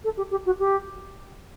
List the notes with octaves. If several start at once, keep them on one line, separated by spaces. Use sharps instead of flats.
A4
G4
G4
F#4
G4